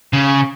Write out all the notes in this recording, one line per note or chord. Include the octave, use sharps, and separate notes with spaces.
C#3